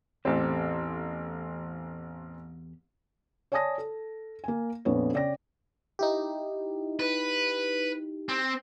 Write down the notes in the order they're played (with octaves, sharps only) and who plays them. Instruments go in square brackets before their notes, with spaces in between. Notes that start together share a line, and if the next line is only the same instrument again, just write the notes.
[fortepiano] A1 C4 [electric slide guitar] E2 G4 A4
[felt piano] C#5 D5 G#5 A5 D#6 A#6
A4
A#3 G#5
A#1 F2 B3 C#5
C#3 C#5 D5 G5 A#6
[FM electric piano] D#4 E4 G4
[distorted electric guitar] B4
C4